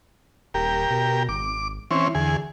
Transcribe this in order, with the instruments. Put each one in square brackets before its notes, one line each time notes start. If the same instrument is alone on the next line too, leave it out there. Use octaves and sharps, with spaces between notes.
[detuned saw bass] D#1 [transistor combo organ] G4 A#4
[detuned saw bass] B2
[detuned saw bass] G#1 [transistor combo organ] D6
[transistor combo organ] E3 C4 C#4 [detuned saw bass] E4
[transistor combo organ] E2 G#4 [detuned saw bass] D3